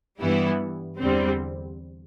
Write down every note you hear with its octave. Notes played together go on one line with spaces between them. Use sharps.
G2 E3 G3 B3 E4
E2 D3 G3 C4